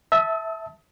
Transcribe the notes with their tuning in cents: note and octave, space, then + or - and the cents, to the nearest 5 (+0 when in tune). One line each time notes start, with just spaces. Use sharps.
E5 -10 A5 +0 D#6 +35